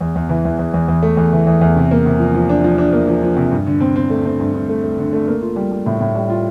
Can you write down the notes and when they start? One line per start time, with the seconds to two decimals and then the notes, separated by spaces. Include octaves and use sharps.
0.01 E2
0.15 E2
0.29 E3
0.45 E2
0.59 E2
0.74 E2
0.88 E2
1.02 A3
1.17 E2
1.33 E3
1.47 E2
1.61 E2
1.76 C3
1.91 A#3
2.06 C3
2.19 F3
2.34 F3
2.49 D4
2.64 F3
2.78 D4
2.93 A#3
3.08 F3
3.23 F3
3.37 C3
3.51 G2
3.67 D3
3.81 C4
3.96 C4
4.10 A3
4.25 C4
4.40 G2
4.54 G2
4.69 A3
4.84 A3
4.98 D3
5.13 A3
5.28 A#3
5.42 F4
5.56 G3
5.71 G3
5.86 A2
6.00 A2
6.16 G3
6.30 F4